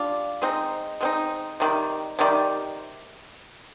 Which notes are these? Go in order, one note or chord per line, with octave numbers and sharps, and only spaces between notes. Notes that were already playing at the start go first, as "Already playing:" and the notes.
Already playing: G3 D4 F4
G#3 C4 D#4
G#3 C4 D#4
C3 D#3 G3
C3 D#3 G3